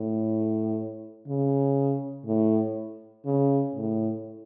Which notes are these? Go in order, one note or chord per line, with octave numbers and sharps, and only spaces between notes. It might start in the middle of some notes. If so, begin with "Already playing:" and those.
Already playing: A2
C#3
A2
C#3
A2